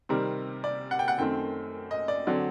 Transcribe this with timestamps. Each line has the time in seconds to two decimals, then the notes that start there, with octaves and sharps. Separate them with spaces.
0.09 C3 D#3 G3 C4 A#4
0.64 D5
0.91 F#5
0.99 G5
1.08 F#5
1.18 F#2 D#3 A3 C4 G5
1.91 D#5
2.08 D5
2.27 D3 F#3 C4 D5